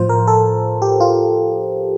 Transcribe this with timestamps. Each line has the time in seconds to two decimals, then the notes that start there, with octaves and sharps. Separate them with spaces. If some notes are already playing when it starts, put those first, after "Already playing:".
Already playing: A2 F3 F4 C5
0.09 A#4
0.27 A4
0.82 G4
1.00 F4